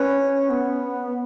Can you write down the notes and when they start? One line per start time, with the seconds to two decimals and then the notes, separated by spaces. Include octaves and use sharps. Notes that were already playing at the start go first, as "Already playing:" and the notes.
Already playing: C#4 B4
0.50 B3